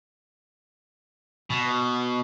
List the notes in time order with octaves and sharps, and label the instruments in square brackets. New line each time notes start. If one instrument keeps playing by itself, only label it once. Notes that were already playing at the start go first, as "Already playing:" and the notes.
[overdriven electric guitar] B2